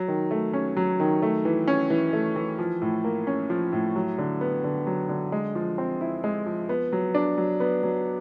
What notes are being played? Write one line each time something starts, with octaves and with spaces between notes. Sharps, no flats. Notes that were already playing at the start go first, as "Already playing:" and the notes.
Already playing: F#3
D#3
A3
C#4
F#3
D#3
A3
E3
C#4
E3
A3
E3
F3
A2
A#3
C#4
F3
A2
F#3
D3
B3
D3
F#3
D3
G#3
F3
C4
E4
G#3
F3
B3
F#3
D4
F#3
B3
F#3